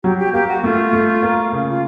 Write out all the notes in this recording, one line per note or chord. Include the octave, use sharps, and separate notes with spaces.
F#3 G4
G4
A#3 G4
F#4
A3 F4
A3
A#3
C#3
F4